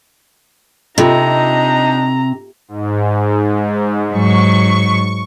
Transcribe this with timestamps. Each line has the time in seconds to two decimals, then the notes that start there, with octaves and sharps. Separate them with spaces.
0.98 C3 D4 D#4 F4 A4 D#5 A#5
2.68 G#2
4.12 G#2 F#3 C#6